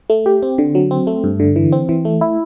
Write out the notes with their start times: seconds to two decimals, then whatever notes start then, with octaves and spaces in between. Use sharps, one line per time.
0.10 A3
0.26 G4
0.43 C4
0.58 D3
0.75 F#3
0.91 C4
1.07 A3
1.24 G2
1.40 D3
1.56 E3
1.72 C4
1.89 E3
2.05 A3
2.21 E4